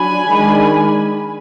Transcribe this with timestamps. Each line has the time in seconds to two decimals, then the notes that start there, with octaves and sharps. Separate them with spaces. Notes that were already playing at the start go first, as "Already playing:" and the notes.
Already playing: F#3 D4 G#5 B5
0.28 D#3 G#3 D4